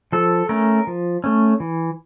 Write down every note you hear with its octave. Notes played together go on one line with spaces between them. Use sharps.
F3 A4
A3 C#4 A#4
F3
A3 C#4
E3